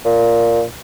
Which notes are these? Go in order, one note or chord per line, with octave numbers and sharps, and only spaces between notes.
A#2